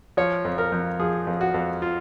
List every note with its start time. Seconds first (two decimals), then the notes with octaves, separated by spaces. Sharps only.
0.17 F3 C#5
0.45 F2
0.58 A#4
0.72 F2
0.99 F3 G#4
1.27 F2
1.41 F#4
1.54 F2
1.82 F4